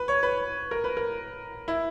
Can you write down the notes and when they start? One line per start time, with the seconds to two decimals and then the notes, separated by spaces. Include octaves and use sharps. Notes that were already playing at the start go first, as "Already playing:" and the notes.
Already playing: B4
0.08 C#5
0.23 B4
0.71 A#4
0.84 B4
0.97 A#4
1.68 E4